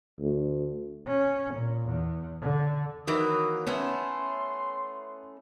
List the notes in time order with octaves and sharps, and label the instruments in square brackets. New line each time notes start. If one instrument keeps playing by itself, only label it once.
[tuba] D2
[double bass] C#4
A#2
E2
D3
[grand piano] D#3 [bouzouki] E3 F#3 A#3 [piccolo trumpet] D#6
[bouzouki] A3 C#4 E4 [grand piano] B3 [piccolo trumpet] C6